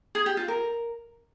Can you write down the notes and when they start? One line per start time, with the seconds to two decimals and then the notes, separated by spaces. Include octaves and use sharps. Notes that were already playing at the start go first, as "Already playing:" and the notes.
0.15 G#4
0.26 G4
0.37 F4
0.48 A#4